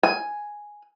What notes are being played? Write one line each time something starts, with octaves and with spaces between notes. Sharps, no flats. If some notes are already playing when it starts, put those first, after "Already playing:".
G#5